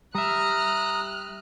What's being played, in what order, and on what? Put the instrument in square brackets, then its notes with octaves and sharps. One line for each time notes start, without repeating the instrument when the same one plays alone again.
[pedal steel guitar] G3 E5 [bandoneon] A#5 D#6 [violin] F6 F#6